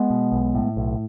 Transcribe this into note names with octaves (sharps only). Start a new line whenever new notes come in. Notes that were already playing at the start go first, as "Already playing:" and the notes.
Already playing: G#3 B3
B2
B1
A2
B1